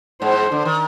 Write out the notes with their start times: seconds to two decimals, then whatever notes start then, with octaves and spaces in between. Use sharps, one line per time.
0.22 G#2 C5
0.51 D3
0.65 D#3